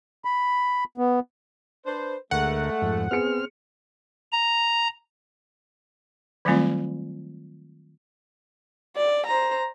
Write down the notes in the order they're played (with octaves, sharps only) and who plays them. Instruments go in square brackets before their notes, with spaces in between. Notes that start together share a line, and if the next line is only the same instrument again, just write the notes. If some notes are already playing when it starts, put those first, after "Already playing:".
[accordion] B5
B3
[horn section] D4 B4 C5
[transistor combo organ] D2 A#4 [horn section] G#3 A3 [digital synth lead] F#5
[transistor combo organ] F2 G#2
[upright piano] B3 G#4 C#7 [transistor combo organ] C4 F6
[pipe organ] A#5
[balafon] D#3 F#3 G3 A3 C4 F4
[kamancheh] D5
C5 A#5